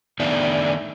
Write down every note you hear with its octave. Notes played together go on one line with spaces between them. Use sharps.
D#3 A3 B3 D4 D#4